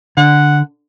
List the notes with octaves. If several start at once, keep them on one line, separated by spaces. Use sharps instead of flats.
D3 F#5